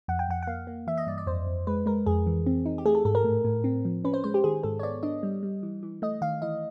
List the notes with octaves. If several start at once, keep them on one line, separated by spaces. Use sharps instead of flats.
F2 F#5
G5
F2 F#5
F#5
A#3 F5
A#3
E3 E5
D#5
G2 D5
D5
F2 C5
F2
G#3 B4
G#3 A#4
F2 G#4
E3
C4
D#4
G4
A3 G#4
A4
G#2 A4
A#4
A2
A2
C4
F3
C#4 B4
C5
G#3 C5
G4
D#3 G#4
G#2 A4
C#5
B3 D5
D4 D#5
G3
G3
E3
E3
A3 D#5
D#3 F5
E3 D#5